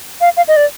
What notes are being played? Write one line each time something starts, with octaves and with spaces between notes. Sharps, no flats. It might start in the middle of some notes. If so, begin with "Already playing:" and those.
F5
F5
D#5
D5